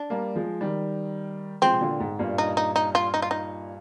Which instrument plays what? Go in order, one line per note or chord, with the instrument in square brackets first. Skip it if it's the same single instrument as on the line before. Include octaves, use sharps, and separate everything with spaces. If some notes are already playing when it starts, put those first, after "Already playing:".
Already playing: [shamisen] D4
[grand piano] G3 A#3
F3 G#3
D#3 G3
[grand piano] F3 G#3 [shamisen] C4
[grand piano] C3
A#2 D3
G#2
G2 A#2
[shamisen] D#4
D#4
D#4
F4
D#4
F4
D#4